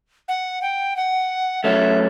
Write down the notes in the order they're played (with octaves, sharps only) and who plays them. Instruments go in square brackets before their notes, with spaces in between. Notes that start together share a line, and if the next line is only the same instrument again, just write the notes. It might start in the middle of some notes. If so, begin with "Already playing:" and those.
[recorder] F#5
G5
F#5
[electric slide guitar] F#3 A3 C#4 [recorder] E5